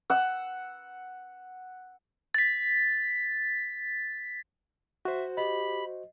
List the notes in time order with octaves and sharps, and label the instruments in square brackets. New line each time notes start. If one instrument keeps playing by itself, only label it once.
[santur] F#5 E6
[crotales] A6 B6
[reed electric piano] F#4 C5 [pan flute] E5
[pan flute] G4 [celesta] D#5 [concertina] B5